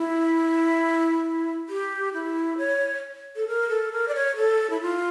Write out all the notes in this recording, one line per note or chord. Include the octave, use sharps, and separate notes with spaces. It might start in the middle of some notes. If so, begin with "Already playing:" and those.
Already playing: E4
G4
E4
C#5
A4
A#4
A4
A#4
D5
C#5
A4
E4
F4